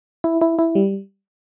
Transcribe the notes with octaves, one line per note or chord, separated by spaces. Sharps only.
E4
E4
E4
G3